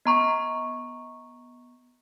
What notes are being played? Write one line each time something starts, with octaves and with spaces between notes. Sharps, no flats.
B3 A#5 C#6